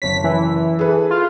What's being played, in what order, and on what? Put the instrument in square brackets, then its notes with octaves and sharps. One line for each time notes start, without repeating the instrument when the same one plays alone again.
[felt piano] F#1 C#5 [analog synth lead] B6
[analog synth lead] E3
[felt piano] G#4 A4 B4
[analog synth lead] F4